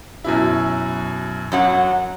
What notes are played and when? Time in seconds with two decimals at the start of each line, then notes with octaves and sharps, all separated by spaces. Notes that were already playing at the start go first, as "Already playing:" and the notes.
0.24 F#2 B2 E4
1.52 F#2 F#3 F#5